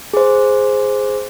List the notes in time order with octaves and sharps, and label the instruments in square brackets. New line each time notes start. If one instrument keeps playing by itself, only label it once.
[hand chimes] G#4 C5